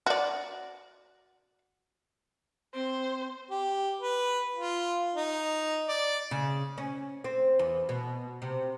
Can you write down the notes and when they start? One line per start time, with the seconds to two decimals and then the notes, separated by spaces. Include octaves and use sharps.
0.06 F#4 D5
2.74 C4 C5
3.50 G4
4.00 B4
4.55 F4
5.15 D#4
5.88 D5
6.31 C#3
6.78 C#4
7.24 C4
7.59 E2
7.89 B2
8.42 C3